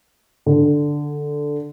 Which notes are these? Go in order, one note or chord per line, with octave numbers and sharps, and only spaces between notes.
D3